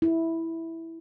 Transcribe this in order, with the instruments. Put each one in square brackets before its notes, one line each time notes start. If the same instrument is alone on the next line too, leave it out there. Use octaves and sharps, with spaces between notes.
[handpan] E4